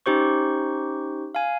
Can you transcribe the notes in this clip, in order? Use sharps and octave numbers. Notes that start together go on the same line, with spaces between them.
C#4 D#4 G4 C5 C#6
F5 G#5